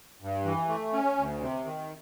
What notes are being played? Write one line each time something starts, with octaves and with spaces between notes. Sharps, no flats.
G2
E3
A3
C#4
D2
C3
D#3